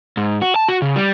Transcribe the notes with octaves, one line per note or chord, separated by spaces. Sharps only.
G#2
F#4
A5
F#4
C#3
G3